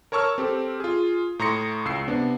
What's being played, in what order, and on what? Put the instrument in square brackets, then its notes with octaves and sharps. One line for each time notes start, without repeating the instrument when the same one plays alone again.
[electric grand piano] A#4 C#5 A5 C#6 E6 F6
C4 G4 A4
F4 G#4
A2 A#5 C6 D#6 A#6 C#7
C#2 E6 C7
C3 B3 D4